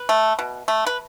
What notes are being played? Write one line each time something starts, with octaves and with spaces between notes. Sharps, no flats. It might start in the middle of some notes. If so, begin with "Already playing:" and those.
Already playing: B4
A3
B2
A3
B4